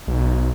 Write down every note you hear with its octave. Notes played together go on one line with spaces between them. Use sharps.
B1